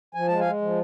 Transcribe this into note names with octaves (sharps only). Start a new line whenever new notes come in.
F3 G#5
G#3 A5
F5 G#5
G#3
F3